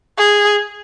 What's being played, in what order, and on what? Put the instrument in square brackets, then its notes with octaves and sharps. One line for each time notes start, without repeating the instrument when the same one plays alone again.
[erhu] G#4